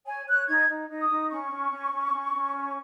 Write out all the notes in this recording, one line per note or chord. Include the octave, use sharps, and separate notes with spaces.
C#5 G#5
C#5 F#6
D#4 G#6
D#4
D#4
D#6
D#4
C#4 C#6
C#4
C#4
C#4
C#4
C#4
C#5